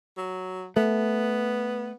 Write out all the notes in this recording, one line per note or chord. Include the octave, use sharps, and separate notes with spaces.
F#3
A3 B3